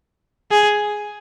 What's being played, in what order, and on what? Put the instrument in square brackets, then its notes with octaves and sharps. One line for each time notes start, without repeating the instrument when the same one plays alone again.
[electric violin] G#4